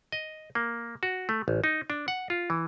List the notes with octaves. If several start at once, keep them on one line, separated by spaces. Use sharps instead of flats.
D#5
A#3
F#4
A3
A1
D#4
D4
F#5
F4
E3